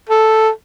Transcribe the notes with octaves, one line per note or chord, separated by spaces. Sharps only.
A4